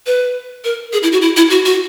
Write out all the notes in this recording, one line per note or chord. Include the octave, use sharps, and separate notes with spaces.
B4
A#4
G#4
E4
F#4
E4
E4
F#4
F#4